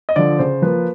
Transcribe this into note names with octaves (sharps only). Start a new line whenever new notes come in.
D#5
D3 F3 D5
C#3 C5
F3 A#3 B4